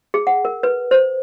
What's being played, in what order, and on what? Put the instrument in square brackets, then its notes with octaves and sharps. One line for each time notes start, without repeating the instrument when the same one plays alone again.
[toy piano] G#4
F#5
A#4
B4
C5